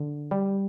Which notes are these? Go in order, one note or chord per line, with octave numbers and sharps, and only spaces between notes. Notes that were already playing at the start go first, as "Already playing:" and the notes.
Already playing: D3
G3